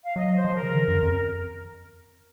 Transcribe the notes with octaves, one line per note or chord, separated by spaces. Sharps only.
F5
F#3 D#5
C5
F3
A#4
C#3
D#3
F#2
F2